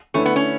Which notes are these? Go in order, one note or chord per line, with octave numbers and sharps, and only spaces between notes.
D3 A3 C#4 E4 B4
B3
C#4